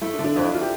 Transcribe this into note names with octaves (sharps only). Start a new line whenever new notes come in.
A3 E4
D4
D3
D4
F2 D4
E4
F4
G4